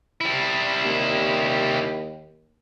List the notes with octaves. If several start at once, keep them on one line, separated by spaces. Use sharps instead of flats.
G3 E4
D#2